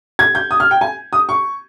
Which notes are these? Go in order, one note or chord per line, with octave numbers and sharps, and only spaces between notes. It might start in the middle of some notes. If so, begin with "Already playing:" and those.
G#6
G6
D#6
F6
G5
G#5
D#6
C#6